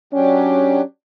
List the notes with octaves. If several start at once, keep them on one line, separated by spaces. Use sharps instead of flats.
F#3 C#4 D4 G4